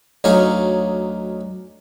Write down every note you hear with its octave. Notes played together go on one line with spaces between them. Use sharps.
D2 F#3 D#4 C#5 F5 G#5